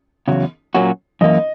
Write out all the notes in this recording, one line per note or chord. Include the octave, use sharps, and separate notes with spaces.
E2 C#3 F#3
A#2 F#3 A#3 C#4 F#4
F#2 E3 A#3 D#5